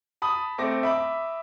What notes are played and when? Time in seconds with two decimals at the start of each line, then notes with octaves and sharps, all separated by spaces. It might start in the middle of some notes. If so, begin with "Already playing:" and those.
0.22 A5 B5 D#6
0.58 A3 C4 D6 A#6
0.83 E5 B5 D6